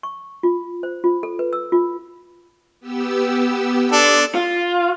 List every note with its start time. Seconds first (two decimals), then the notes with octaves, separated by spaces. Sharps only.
0.03 C#6
0.43 F4
0.83 C5
1.04 F4
1.23 A4
1.39 B4
1.53 E6
1.72 F4
2.80 B3 G4 E6
3.92 D4 A4 C6 D6 D#6
4.35 F4